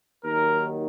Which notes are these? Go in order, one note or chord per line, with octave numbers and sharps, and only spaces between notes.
D#2 D#3 F#3 A#4